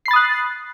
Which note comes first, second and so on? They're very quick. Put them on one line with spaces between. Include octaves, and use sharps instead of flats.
C7 B5 A6 D#6 F#6